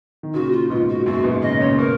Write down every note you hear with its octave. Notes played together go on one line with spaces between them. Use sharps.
D#3
A#2 C#3 F#4
F4
G#2 B2 F4
F#4
F#2 A#2 F#4
G#2 B2
A#2 C#3 D#5
A#2 C#3 C#5
B2 A#4